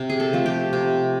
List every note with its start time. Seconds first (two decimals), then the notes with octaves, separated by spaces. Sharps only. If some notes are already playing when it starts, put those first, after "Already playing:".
Already playing: C3
0.10 G#4
0.20 A4
0.33 F3 A3 C4
0.46 G4
0.73 C3